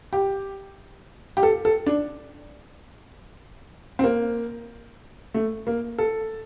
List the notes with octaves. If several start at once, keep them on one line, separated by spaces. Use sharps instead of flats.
G4
G4
A4
A4
D4
C4
A#3
A3
A#3
A4